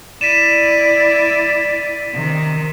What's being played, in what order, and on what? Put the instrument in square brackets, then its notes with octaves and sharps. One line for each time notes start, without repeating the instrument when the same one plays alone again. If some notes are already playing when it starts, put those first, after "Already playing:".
[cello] E4 D5 [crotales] B6 D#7 E7
[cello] C3 D#3